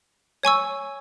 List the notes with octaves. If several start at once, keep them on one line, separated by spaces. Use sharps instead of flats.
C#5 G#5 C#6 E6